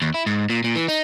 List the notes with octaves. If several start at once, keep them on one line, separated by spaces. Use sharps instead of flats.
D#2
E4
G#2
A#2
A#2
E3
D#4